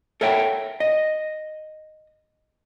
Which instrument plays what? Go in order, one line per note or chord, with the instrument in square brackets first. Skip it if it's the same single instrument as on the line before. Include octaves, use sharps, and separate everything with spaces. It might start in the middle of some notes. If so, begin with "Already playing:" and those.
[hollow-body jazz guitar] A4 A#4 C#5 E5 F#5 G5
D#5